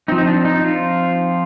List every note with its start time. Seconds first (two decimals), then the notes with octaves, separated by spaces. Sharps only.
0.08 F3 C4 D#4
0.27 D4
0.45 D#4
0.64 F4